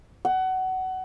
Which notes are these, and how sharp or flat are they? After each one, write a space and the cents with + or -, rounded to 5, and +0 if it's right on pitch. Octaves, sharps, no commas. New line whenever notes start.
F#5 +20